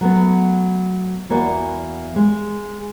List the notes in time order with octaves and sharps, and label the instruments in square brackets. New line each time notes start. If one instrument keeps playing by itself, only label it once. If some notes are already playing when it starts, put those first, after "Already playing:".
[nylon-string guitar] F#3 A3 B3
E2 E3 A#3 F#4 D5
G#3